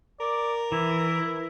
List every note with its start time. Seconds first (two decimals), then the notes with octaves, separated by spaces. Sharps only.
0.20 A#4 D5
0.72 E3 E4